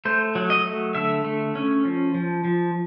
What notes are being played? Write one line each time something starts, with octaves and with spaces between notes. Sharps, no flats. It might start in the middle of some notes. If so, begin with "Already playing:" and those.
A3 C5
F#3
D#5
A3
D3 E5
A3
C#4
F3
F3
F3